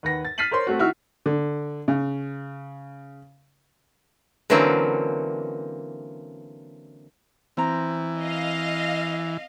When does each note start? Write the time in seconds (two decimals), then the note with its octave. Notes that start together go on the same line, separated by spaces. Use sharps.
0.03 D#2 B4 F#5 A#6
0.25 A6
0.38 F6 A6 B6 C7 D#7 F#7
0.51 A#4 C5 C#5 C6
0.67 A3 C4 F#4
0.79 D#3 E4 F#4 E5 F6
1.26 D3
1.88 C#3
4.50 D3 E3 F#3 A#3 C4 C#4
7.57 E3 C4 A#5 G6
8.19 D#5 F5